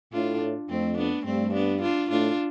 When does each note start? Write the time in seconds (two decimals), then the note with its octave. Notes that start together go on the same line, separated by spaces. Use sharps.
0.13 A2 D4 F4
0.69 F2 A3 C4
0.98 B3 D4
1.25 G2 A3 C4
1.54 B3 D4
1.82 D4 F4
2.10 A2 D4 F4